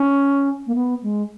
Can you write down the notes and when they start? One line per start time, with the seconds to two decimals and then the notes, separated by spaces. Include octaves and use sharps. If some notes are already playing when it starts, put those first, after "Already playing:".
Already playing: C#4
0.67 A#3
0.75 B3
1.03 G#3